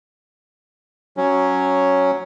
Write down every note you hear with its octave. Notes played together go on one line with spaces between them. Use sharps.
F#3 C#4